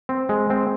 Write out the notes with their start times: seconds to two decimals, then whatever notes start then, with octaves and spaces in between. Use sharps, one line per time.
0.09 C4
0.29 G#3
0.50 C4